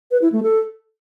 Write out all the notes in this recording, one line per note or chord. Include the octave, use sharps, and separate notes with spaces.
B4
E4
A3
A4